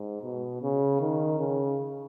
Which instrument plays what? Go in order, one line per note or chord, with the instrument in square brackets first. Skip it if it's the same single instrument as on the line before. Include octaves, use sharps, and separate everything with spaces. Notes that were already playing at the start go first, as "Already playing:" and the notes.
Already playing: [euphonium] G#2
B2
C#3
D#3
C#3